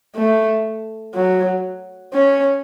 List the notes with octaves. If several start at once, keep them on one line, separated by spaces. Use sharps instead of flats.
A3
F#3
C#4